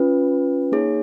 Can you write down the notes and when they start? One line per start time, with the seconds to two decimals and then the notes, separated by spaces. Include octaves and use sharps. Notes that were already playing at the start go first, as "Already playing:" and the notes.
Already playing: C#4 F4 B4
0.72 A#3 D#4 G#4 C#5